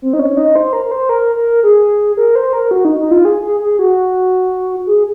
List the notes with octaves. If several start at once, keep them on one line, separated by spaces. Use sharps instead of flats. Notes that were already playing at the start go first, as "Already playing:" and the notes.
C4
D#4
C#4
D#4
C5
A#4
A#4
C5
A#4
A#4
G#4
A#4
C5
A#4
F#4
D#4
D#4
F4
G#4
G#4
G#4
F#4
G#4